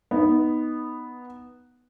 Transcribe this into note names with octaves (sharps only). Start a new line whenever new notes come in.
B3 D#4